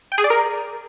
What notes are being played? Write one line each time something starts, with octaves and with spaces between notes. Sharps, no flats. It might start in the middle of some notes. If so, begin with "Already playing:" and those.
G5
G#4
D5
A#4